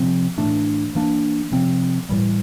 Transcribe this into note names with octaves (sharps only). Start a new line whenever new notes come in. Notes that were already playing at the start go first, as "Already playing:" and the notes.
Already playing: C3 F3 C4
A2 E3 A3 D4
E3 A#3 D4
C3 F3 C4
A2 E3 G3